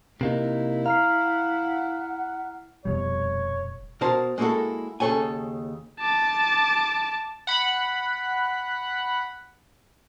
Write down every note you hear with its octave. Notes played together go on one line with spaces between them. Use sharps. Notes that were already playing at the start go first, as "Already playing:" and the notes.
C3 A#3 D#4 E4
F5 A#5 F6 C7
F#5
D#1 F2 B2 G3 C#5
B2 A#4 C5 A5
G#3 A#3 D4 E4 F#4 A4
D#2 C#3 A#3 A4 C#5 G#5
A5 D6
F#5 B5